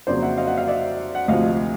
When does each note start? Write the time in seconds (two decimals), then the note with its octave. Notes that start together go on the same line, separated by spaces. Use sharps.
0.07 F2 C#3 F#3 A#3 C5 D5
0.22 E5 F#5
0.37 D#5 F5
0.47 E5 F#5
0.58 D#5 F5
0.68 D5 E5
1.15 F#5
1.28 D2 C3 F3 D#5 F5